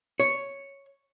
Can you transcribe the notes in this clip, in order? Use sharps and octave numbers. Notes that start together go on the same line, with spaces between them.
C#5